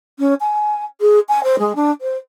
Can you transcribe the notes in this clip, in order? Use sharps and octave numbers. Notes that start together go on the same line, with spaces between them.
C#4
G#5
G#4
G#5
C5
G#3
D4
C5